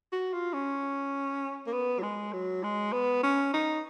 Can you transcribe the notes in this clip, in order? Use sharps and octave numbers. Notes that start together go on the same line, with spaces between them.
F#4
F4
C#4
A#3
B3
F#3
G#3
F#3
G#3
B3
C#4
D#4